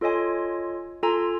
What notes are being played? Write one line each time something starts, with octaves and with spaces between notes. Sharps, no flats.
F4 A4 C#5 D#5 G#5 C6
F4 A4 G#5 A#5 C6